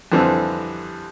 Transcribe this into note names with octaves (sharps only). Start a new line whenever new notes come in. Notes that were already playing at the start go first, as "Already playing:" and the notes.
F2 D3 E3 G3 C4